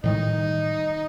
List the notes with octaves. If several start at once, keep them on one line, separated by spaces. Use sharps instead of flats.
A2 D#3 G3 D#4